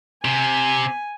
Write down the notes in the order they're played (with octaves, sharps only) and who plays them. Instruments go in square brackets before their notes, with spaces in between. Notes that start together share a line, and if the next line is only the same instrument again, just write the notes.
[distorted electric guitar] C3 [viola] G#5